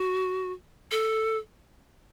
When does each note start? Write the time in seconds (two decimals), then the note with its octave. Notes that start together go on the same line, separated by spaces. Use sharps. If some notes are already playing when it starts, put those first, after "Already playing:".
Already playing: F#4
0.91 A4